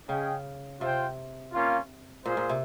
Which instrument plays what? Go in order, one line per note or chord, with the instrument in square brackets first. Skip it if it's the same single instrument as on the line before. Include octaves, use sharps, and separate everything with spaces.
[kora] C#3 [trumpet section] C#4 G#4 D#5 G5
[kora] C3 [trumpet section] F4 C5 G5
[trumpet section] A#3 C#4 F4
[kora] A#2 [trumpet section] F4 G#4 C5
[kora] A#2
C3